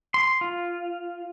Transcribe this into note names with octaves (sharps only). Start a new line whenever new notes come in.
C6
F4